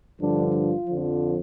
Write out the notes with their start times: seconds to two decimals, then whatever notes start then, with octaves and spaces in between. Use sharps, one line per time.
0.20 G2 D3 F3 D4
0.54 F4
0.87 F2 D3 F3